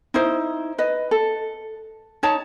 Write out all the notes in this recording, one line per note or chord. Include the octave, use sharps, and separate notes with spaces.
D#4 E4 C5
B4 D#5
A4
D#4 C#5 A5